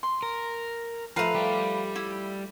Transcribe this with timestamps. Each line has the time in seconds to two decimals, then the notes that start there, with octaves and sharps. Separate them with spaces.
0.03 C6
0.23 A#4
1.16 F3 A3 B4 F5 A#5
1.35 G3 G4
1.96 E4